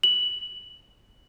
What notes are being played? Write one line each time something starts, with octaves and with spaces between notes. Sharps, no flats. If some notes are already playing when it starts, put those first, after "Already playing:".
F#7